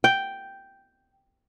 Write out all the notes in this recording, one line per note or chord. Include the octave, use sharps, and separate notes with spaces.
G5